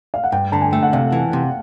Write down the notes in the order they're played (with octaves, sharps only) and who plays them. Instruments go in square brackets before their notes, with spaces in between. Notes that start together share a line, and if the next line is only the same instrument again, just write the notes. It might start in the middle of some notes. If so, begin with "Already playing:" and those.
[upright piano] F5
F#5
[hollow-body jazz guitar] G2 [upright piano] G5
[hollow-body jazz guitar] D3 [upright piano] A5
[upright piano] G#5
[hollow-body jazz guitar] A3 [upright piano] G5
[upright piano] F#5
[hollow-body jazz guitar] C3 [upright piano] F5
[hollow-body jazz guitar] E3
C3